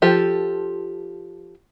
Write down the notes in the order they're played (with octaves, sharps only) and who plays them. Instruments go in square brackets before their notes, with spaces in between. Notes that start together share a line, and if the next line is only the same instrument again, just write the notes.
[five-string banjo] F3 F4 G4 A4